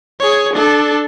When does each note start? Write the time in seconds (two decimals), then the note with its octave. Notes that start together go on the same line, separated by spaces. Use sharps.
0.20 G#4 C#5
0.53 D4 A4